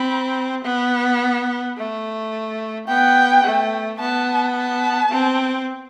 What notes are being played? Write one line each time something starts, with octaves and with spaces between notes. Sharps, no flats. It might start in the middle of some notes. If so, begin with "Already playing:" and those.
Already playing: C4 B5
B3
A3
B3 G5
A3
B3 A5
A5
C4